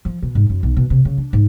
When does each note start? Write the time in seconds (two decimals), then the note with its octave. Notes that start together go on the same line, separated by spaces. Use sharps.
0.05 F3
0.22 B2
0.35 G#2
0.50 F#2
0.63 B1
0.77 B2
0.90 C3
1.05 C#3
1.18 D4
1.33 G#2